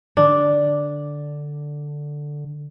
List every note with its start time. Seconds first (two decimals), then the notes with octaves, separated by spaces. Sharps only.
0.17 D3 D4